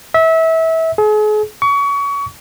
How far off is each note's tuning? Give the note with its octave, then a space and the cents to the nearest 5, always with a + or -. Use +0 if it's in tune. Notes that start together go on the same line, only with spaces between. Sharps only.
E5 -25
G#4 +40
C#6 +30